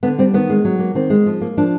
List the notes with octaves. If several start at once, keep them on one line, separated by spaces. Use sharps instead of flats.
D3 B3
G3 C4
D#3 B3
G#3
F#3
A#3
D#3 C4
G#3
F3
A#3
F3 D4